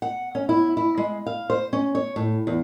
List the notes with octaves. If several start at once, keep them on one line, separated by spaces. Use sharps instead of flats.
F#5
C#4
E4
E4
G#3
F5
C5
C#4
C#5
A2
E2